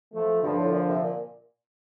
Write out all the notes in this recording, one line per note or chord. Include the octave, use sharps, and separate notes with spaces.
F3 A3
G2 D3 F3
A2
A#2
C3
A#2